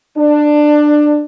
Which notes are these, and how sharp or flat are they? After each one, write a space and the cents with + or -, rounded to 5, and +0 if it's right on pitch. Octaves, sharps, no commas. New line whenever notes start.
D4 +15